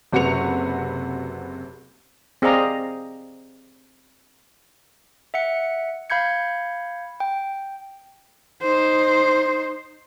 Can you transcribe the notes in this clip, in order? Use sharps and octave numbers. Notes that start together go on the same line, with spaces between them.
F#1 C3 F#4 B4 C#7 F7
C4 G#4 D5 D#5 F5 A#5
E5 F#5 C#7
F5 B5 G6 G#6 C#7
G5
D#4 C5